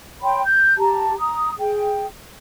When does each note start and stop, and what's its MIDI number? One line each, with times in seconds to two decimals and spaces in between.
0.22 0.42 73
0.22 0.42 79
0.22 0.42 83
0.22 0.42 84
0.44 0.74 91
0.77 1.14 67
0.77 1.14 81
0.77 1.14 82
1.17 1.51 82
1.17 1.51 87
1.59 2.06 68
1.59 2.06 79